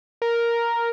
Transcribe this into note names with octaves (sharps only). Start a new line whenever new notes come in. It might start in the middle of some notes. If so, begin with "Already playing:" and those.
A#4